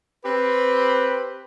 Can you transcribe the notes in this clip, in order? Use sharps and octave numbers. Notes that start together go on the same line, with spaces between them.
C4 G4 B4